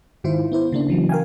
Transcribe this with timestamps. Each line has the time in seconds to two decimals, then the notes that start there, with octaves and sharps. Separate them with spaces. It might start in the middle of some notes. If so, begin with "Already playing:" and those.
0.24 G#2 D#3 E4 F4 C5
0.52 B3 E4 C5
0.72 C#3 A#3 D4
0.88 C#3 E3 F#3
1.09 A#4 F5 G5 G#5